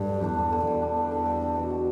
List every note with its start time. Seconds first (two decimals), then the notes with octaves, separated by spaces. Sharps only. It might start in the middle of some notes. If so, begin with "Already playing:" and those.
Already playing: G2 D3
0.09 G3
0.23 E2 D4
0.39 D3
0.53 D3
0.67 E2 G3
0.82 D4
0.97 D3
1.12 D3
1.26 G3
1.42 D4
1.55 B2
1.70 B2